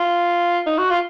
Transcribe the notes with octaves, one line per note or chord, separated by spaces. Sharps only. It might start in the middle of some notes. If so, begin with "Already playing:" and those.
Already playing: F4
D#4
F#4
F4